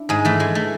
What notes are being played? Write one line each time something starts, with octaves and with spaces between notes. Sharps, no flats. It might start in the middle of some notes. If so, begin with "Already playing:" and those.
Already playing: D4 E4
G#2 G#3
E3 A3
E3 G#3
A3